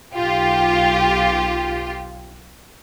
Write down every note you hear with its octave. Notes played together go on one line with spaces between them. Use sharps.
B1 F4 G4